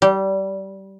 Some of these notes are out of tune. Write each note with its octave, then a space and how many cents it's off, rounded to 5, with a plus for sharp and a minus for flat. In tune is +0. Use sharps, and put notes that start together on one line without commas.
G3 -20